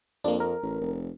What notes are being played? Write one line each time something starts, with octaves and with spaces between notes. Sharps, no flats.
F2 A#3 D4
A#4
A1
F1